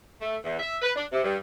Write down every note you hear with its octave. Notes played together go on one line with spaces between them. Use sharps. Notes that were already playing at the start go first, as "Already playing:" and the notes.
A3
E2
E5
B4
D4
C3
G2